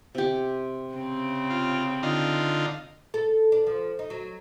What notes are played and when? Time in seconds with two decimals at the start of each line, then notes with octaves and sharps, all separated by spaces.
0.15 C3 G4
0.95 C#3 C4
1.50 F4
2.03 D3 D#4 F4
3.14 A4
3.52 D4
3.67 F3
3.99 D#4
4.10 F#3